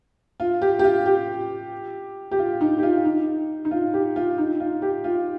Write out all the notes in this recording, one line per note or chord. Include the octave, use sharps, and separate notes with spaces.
F4
G4
G4
F4
G4
G4
F4
D#4
G4
F4
D#4
D#4
F4
G4
F4
D#4
F4
G4
F4